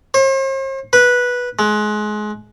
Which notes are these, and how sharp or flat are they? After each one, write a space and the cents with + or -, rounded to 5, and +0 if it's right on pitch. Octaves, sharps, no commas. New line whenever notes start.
C5 +45
B4 -10
G#3 +25